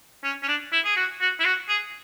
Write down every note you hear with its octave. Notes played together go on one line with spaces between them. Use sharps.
C#4
C#4
D4
E4
G#4
F#4
F#4
E4
F#4
G#4